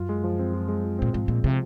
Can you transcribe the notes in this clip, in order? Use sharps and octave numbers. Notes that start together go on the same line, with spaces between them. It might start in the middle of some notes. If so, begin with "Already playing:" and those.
Already playing: F#2 F4
G#3
F3
C4
F4
G#3
F3
A#2 C4
G#2 F3
A#2 G#3
C3 F3